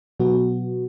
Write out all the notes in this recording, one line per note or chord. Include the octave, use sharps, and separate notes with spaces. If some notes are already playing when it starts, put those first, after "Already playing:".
B2 F#3 B3 F#4